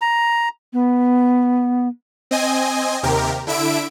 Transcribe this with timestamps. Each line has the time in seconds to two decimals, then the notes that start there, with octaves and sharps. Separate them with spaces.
0.01 A#5
0.73 B3
2.31 C4 D#5 G#5
3.03 D#2 C3 G4 A#4
3.47 D3 E4 E5 D7